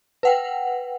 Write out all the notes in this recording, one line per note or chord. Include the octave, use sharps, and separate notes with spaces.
B4 F#5 G5